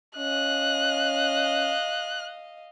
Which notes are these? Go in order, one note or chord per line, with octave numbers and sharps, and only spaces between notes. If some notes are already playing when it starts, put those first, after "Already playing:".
C#4 D#5 F5 F#6